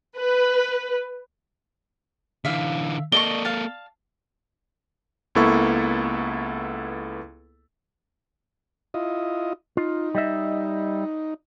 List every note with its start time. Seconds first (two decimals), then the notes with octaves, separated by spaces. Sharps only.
0.16 B4
2.45 D3 E3 E5 F5
3.12 A#3 A4 D5 D#5 C#6 G7
3.45 F5 A5
5.35 C#2 A#3 B3 E4 A4 C#6
8.94 E4 F4 D#5
9.77 D#4 F4
10.15 G3 D#5 E5